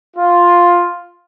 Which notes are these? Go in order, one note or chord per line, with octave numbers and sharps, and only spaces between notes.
F4